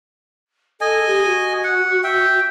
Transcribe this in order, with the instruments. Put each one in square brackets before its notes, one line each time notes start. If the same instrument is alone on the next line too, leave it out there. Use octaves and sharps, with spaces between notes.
[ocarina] A4 [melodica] D#5 G#5
[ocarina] G4
F#4
[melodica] F#5
E5 G5